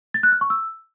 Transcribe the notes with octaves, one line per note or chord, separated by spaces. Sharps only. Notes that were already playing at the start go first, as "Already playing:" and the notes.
A6
F#6
F6
C#6
E6